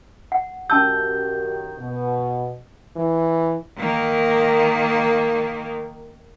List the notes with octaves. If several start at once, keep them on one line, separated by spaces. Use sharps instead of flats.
F#5
F#2 D#3 C#4 G4 A5 E6 G6
B2
E3
D#3 A#3